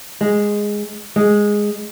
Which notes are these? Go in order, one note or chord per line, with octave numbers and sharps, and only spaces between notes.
G#3
G#3